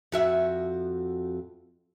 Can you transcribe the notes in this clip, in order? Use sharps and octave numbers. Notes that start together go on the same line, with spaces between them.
F2 F#4 E5